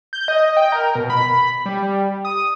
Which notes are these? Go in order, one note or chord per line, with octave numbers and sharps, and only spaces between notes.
G6
D#5
G5
A#4
B2
B5
G3
D#6